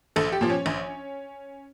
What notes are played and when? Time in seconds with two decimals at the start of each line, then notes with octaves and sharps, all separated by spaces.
0.16 A#1 A4
0.32 G4
0.41 A#2 F3
0.50 C#4
0.66 A#1